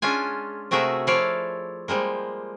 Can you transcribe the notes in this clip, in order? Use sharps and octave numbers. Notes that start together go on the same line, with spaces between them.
G#3 C#4 D4 F4 G#5
C3 A3 F#4 G#4 A#4 E5
F3 E4 C#5 D5 F5
F3 G3 G#3 A#3